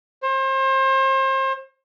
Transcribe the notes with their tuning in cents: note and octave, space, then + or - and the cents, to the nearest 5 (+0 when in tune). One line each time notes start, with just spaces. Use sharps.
C5 +35